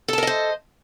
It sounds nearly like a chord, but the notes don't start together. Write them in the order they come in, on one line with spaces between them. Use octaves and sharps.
A4 A5 A#4 D#5 C5